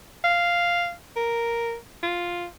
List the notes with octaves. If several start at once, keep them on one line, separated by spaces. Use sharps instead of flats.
F5
A#4
F4